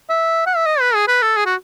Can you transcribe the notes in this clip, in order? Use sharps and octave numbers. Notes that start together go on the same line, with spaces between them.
E5
F#5
E5
D#5
B4
G#4
B4
A4
G#4
F#4